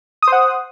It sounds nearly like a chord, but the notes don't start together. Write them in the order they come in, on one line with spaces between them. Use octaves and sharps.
D#6 C5 F#5